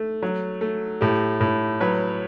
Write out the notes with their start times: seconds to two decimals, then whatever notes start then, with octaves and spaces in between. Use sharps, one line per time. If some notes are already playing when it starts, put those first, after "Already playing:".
Already playing: A3
0.23 F#3
0.61 A3
1.01 A2 G4
1.41 A2
1.80 F#3 B4